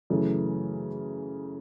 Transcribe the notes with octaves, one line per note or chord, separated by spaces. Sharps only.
F#2 C#3 E3 A3